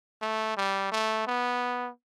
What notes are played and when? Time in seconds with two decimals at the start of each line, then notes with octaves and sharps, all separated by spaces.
0.22 A3
0.57 G3
0.92 A3
1.27 B3